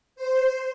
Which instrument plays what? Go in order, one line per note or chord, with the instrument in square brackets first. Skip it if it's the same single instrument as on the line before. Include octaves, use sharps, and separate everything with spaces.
[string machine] C5